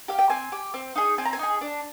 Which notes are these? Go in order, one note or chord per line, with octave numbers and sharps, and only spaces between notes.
G4 F5
G5
C4 G#5
G4
C4
D#4 G#4
C4 G#5
A#5
G#5
D#4 G#4
D4